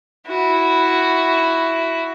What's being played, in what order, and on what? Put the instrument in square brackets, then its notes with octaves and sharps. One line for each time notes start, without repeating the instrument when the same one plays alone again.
[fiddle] E4 F#4